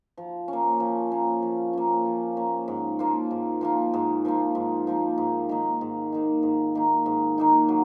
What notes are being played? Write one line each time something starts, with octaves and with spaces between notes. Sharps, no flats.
F3
A#3 C#4
F3
A#3 C#4
F3
A#3 C#4
F3
A#3 C#4
G#2
F3 A#3 F4
G#2
F3 A#3 F4
G#2
F3 A#3 F4
G#2
F3 A#3 F4
G#2
D#3 A#3 D#4
G#2
D#3 A#3 D#4
G#2
D#3 A#3 D#4
G#2
D#3 A#3 D#4
F#3